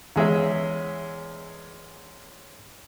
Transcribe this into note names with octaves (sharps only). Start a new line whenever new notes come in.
E2 G#3 C#4 E5